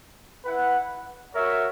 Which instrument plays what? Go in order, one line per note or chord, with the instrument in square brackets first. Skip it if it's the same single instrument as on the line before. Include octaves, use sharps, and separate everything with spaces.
[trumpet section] E4 B4 F#5
F#4 A#4 C#5 E5